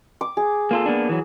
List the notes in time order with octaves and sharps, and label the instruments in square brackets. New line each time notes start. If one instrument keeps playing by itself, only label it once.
[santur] D6
G#4
[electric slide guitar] A#3 F4 A4
A#3 B3 D4
E3 F#3